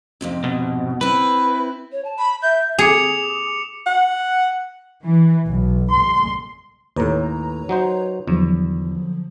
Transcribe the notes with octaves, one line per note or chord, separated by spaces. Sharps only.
F2 G#2 C3
B2
C4 E4 B4
C#5
A5
B5
E5 G6
G#4 D6 C#7 F7
F#5
E3
B1
C6
D#2 A2 B4 C#5 A#5
F#3 D#4 C5
E2 D3 F3 F#3